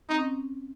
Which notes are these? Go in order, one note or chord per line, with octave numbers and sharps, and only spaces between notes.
C4 D#4
C#4